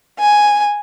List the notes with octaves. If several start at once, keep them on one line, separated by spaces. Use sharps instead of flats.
G#5